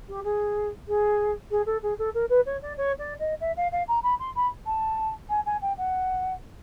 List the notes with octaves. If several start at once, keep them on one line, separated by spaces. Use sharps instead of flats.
G4
G#4
G#4
G#4
A4
G#4
A4
A#4
B4
C#5
D5
C#5
D5
D#5
E5
F5
F5
A#5
B5
C6
B5
A5
G#5
G#5
G5
F#5